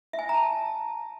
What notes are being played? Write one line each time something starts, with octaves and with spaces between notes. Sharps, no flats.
E5
G#5
E5
A#5
A5